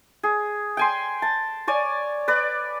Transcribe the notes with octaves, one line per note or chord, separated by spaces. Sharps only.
G#4
G5 G#5 C6
A5
C#5 D5 G#5
B4 D5